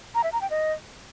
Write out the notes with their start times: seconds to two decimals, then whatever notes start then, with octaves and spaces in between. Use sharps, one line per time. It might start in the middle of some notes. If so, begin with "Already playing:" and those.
0.15 A#5
0.24 E5
0.33 A#5
0.41 G5
0.50 D#5